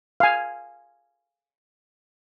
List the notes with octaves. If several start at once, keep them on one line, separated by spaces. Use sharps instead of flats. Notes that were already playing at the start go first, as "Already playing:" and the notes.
F5 G#5